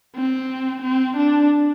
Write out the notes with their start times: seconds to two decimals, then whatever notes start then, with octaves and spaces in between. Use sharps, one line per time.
0.16 C4
0.82 C4
1.17 D4